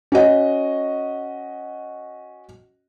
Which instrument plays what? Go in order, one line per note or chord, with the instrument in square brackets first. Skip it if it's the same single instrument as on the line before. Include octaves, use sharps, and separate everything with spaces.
[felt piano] C#4 F#4 D#5